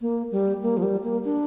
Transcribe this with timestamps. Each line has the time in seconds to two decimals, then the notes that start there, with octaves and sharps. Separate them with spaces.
0.01 A#3
0.31 G3
0.62 A#3
0.77 F3
0.83 G3
1.03 A#3
1.25 D4